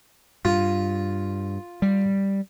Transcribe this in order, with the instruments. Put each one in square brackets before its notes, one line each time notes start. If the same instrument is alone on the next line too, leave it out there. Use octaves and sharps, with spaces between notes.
[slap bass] G2 [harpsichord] F4
[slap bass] G3